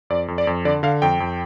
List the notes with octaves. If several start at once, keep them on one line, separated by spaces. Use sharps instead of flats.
F2 D5
F2
D5
F2
D3 D5
D3 F5
F2 G5
F2